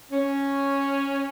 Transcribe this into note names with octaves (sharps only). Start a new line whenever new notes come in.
C#4